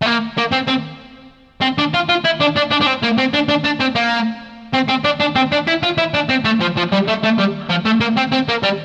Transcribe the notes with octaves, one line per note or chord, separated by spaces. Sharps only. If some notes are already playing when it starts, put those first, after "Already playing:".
A3
A#3
A#3
C4
C4
C4
D4
F4
F4
E4
D4
D4
D4
D4
C4
A#3
C4
D4
D4
D4
C4
A#3
C4
C4
D4
D4
C4
D4
E4
F4
E4
D4
C4
A3
F3
F3
G3
A3
A3
G3
F3
A3
A#3
C4
C4
A#3
G3